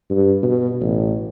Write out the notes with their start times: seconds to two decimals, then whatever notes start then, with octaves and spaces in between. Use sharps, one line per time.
0.10 G2
0.43 B2
0.81 A1